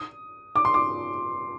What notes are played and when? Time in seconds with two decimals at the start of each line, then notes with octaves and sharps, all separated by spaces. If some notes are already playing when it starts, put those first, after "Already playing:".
Already playing: D#6
0.56 D6
0.65 C6
0.74 D6